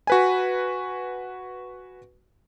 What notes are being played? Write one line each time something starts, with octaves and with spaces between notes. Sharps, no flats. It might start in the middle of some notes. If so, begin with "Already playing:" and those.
F#4 B4 G#5